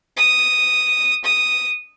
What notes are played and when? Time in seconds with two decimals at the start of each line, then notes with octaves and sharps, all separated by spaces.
0.17 D#6
1.24 D#6